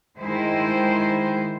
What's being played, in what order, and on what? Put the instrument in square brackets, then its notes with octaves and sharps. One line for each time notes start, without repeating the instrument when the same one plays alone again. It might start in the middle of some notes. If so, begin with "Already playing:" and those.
[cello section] D#3 G#3 E4 C5